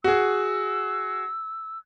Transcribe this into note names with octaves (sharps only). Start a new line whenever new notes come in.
F#4 G#4 E6